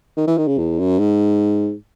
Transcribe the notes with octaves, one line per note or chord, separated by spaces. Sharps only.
D#3
E3
D#3
C#3
E2
F#2
G#2